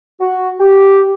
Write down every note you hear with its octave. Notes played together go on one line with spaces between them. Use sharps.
F#4
G4